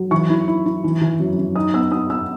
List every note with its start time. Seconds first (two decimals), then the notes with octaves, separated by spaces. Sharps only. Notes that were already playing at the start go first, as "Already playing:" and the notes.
Already playing: F#3
0.11 E3 C#6
0.30 E4
0.48 E4
0.66 E4
0.84 E3
1.01 E3
1.20 F#2
1.38 F#2
1.56 D#4 D#6
1.74 B3 E6
1.92 B3 D#6
2.10 B3 E6